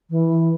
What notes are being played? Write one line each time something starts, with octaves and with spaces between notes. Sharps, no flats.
E3